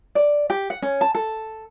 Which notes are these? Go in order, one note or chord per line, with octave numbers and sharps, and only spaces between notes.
D5
G4
F#5
C#4
A5
A4